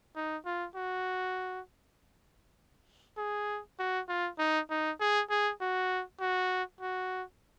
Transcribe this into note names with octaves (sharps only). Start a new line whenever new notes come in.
D#4
F4
F#4
G#4
F#4
F4
D#4
D#4
G#4
G#4
F#4
F#4
F#4